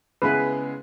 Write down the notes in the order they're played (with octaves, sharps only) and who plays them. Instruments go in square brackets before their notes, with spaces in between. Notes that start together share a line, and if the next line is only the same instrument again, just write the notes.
[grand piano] C#3 G#3 B3 E4 G#4 [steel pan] B4